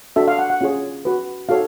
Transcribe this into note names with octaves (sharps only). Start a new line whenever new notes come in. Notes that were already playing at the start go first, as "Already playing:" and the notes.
D4 F#4 A4 E5
F5
F#5
F#5
C#4 F4 G#4 C#5
F#4 B4
D#4 F#4 A4 C#5 F5